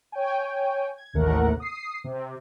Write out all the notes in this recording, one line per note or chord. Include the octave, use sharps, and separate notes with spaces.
C#5 G5 G#5
G#6
A1 D#2 C3 A3 A#4 F#5
D#6 C7
C3